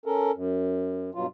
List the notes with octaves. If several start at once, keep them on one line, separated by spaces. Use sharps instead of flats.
C#4 A4 A#4
F#2
G2 B2 F#3 F4